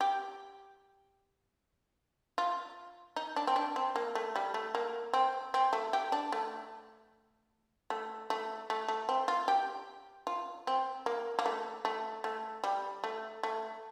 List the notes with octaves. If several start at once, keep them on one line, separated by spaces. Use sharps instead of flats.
G4
F4
D#4
D4
C4
D4
C4
A#3
A3
G3
A3
A#3
C4
C4
A3
G4
D4
A3
A3
A3
A3
A3
C4
F4
G4
F4
C4
A#3
A#3
A3
A3
A3
G3
A3
A3